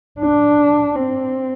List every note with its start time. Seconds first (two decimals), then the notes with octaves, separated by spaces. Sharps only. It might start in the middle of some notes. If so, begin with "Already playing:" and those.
0.20 D4
0.96 C4